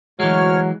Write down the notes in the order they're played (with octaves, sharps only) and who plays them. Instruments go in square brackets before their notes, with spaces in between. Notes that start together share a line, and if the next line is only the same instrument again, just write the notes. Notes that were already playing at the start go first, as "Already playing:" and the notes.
[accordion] D2 C#5 F6 [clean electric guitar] E3 G#3 [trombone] F#3